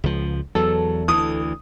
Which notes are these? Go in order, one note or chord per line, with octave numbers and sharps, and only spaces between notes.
C#2 F3
E2 F#3 A4
D2 E3 D#6